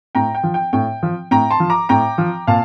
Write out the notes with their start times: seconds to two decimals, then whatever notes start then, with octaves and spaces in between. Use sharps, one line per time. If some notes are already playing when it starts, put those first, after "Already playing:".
0.15 A2 G5 A#5
0.35 G5
0.43 F3
0.54 G5
0.73 A2 G5
1.03 F3
1.31 A2 G5 A#5
1.51 A5 C6
1.60 F3
1.70 A#5 D6
1.89 A2 G5 A#5
2.18 F3
2.47 A#2 F5 A5